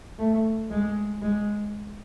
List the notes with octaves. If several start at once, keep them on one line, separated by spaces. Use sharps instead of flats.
A3
G#3
G#3